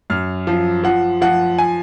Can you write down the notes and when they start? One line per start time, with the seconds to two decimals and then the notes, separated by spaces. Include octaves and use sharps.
0.10 F#2 F6
0.47 F3
0.84 F3 F#5
1.22 F3 F#5
1.58 G#5